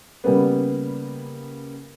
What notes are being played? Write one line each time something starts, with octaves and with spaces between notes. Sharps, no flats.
C#3 G3 A#3 B3